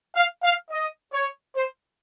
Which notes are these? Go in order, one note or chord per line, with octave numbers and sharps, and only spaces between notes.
F5
F5
D#5
C#5
C5